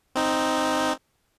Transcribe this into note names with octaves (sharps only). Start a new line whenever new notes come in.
C4 D#4